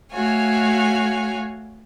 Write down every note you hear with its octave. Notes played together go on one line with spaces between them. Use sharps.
A3 F#4 C#5 F5 G#5